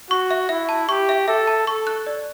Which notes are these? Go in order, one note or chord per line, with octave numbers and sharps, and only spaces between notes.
F#4 C#6
E5
E4 E5
A5
G4 C#6
E5
A4 E5
A5
A4 C#6
F#6
D5